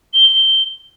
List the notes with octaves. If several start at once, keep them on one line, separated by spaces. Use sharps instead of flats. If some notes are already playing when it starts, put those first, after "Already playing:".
G7